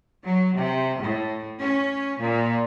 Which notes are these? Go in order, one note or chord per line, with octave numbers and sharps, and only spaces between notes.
F#3
C3
A2
C#4
A#2